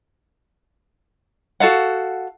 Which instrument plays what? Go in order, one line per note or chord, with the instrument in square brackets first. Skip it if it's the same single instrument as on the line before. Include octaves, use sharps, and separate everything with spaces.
[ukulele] F#4 A4 F5 F#5